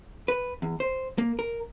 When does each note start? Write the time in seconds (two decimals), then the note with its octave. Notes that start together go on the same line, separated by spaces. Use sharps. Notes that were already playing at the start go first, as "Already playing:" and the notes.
0.28 B4
0.62 E2
0.80 C5
1.18 A#3
1.39 A#4